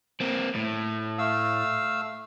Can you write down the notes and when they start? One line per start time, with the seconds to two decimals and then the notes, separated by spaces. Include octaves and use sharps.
0.20 A#3 C4
0.55 A2
1.19 A3 F5 E6